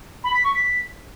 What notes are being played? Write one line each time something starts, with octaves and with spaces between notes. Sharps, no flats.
B5
B6
C#6
B6